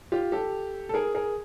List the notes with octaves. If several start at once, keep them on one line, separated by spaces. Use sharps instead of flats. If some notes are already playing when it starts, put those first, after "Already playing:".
F4 G4
G4 A4
A4
G#4 A#4
G#4 A#4